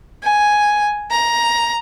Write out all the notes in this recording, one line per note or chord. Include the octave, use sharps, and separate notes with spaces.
G#5
A#5